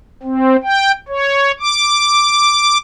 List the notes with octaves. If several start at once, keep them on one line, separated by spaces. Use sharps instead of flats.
C4
G5
C#5
D6